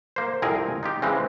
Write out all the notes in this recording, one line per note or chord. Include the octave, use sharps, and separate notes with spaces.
A#3 C5
C2 F2 C4 G#4 A#4 G#5
D#4 F4 G4
C#3 E3 G#3 C4 C#4